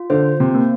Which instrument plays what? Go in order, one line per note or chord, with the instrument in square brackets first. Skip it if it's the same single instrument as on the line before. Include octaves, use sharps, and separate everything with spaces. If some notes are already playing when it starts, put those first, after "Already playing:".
Already playing: [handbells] F4
[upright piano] D3 [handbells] C5
[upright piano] C3
[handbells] A#3